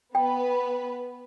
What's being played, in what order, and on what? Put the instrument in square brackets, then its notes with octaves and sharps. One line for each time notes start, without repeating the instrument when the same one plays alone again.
[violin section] B3 B4 [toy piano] G5